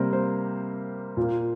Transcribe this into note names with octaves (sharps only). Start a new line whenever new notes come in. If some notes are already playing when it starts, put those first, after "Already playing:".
Already playing: C3 G3 A#3 A#4 C5
C5
A#2 A#3